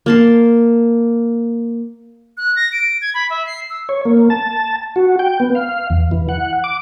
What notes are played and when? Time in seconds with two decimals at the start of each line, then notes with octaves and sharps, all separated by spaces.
0.06 A#3 A5 C6
2.37 F#6
2.56 A#6
2.72 D7
3.02 G#6
3.14 B5
3.30 E5
3.47 C7
3.70 E6
3.89 C#5
4.05 A#3
4.30 A5
4.96 F#4
5.19 G5
5.40 B3
5.55 F5
5.90 E2
6.11 E3
6.29 F#5
6.64 D6